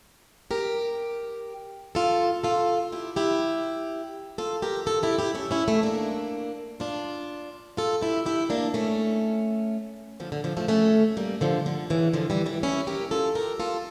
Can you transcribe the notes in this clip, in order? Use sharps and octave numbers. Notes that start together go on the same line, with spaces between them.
G4 A#4
F4 A4
F4 A4
E4 G4
E4 G4
F4 A4
G4 A#4
F4 A4
E4 G4
E4 G4
C#4 E4
C#4 E4
A3 C#4
A#3 D4
D4 F4
F4 A4
E4 G4
E4 G4
A#3 D4
A3 C#4
D3 F3
D3
D3 F3
F3 A3
A3 C#4
G3 A#3
D3 F3
D3
C#3 E3
D3 F3
E3 G3
E3 G3
C#4 E4
G4 A#4
F4 A4
G4 A#4
F4 A4